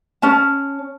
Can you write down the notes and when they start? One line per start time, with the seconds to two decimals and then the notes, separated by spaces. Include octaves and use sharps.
0.22 C#4 A5